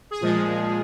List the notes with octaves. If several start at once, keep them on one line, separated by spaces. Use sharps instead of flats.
G#4
A#2 F3 G#3